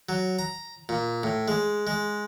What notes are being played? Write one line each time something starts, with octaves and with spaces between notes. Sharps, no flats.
F#3
A#5
A#2
A2
G#3
G#3